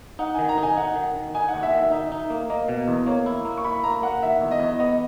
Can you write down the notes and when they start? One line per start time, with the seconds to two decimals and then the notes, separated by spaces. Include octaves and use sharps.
0.19 D#4 F#5
0.35 D#3 G#5
0.49 A#5
0.58 D#4 G#5
0.77 D#4 F#5
0.96 D#3
1.15 D#3
1.35 D#4 G#5
1.48 F#5
1.54 D#2
1.63 E5
1.73 D#3 E5
1.91 D#4 E5
2.12 D#4
2.30 A#3
2.50 A#3 D#5
2.69 B2
2.88 E2
3.06 A#3 C#5
3.26 E4
3.45 A#3
3.57 C#6
3.64 E4 B5
3.84 A#3 A#5
4.02 A#3 F#5
4.22 D#3 E5
4.41 E2
4.51 D#5
4.60 E2
4.79 B3 D#5